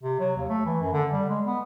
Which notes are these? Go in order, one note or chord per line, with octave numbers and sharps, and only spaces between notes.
C3
F#3
D#2
A3
E3
F#2
D3
G3
G#3
B3